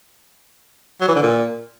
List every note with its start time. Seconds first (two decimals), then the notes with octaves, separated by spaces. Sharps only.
1.01 F#3
1.08 E3
1.15 D3
1.22 A#2